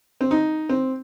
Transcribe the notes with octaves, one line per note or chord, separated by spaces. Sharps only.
C4
D#4
C4